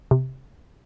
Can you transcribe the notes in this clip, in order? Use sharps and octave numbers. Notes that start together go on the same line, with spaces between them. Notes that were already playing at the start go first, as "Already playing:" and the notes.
C3